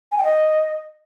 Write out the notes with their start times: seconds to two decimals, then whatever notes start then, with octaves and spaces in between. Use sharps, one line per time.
0.12 G#5
0.18 G5
0.24 D#5